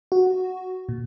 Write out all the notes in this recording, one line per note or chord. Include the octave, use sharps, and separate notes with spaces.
F#4
A#2